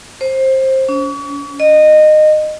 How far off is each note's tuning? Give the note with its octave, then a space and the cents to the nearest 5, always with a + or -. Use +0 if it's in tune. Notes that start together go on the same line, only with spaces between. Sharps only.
C5 +20
C#4 +40
D#5 -20